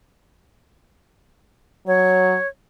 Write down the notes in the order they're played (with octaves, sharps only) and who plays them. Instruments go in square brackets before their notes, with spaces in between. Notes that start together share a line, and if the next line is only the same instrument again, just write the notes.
[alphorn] F#3 [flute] C#5